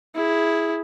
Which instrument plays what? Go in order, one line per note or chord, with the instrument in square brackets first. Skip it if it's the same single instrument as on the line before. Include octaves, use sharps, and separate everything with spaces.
[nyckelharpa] E4 G#4